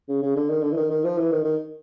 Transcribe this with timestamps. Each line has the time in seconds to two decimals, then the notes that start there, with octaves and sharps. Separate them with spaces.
0.08 C#3
0.22 C#3
0.36 D3
0.49 D#3
0.63 D3
0.72 E3
0.77 D#3
0.90 D#3
1.04 F3
1.18 E3
1.32 D#3
1.44 D#3